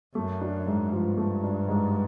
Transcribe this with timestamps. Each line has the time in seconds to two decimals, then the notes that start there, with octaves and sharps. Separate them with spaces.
0.15 F#2 A3
0.41 D4
0.67 G#2
0.92 G2 F3
1.17 A3
1.44 D4
1.68 G#2